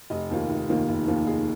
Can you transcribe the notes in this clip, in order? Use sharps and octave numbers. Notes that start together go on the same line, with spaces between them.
F1 D#5
D#2 D#3 A#3 F4
F1
D#2 D#3 A#3 F4
F1
D#2 D#3 A#3 F4
F1 G#4